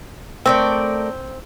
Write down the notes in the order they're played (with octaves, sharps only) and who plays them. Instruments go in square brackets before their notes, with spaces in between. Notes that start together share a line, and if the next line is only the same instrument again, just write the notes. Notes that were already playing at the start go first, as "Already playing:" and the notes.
[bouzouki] A3 A#4 D5 [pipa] C4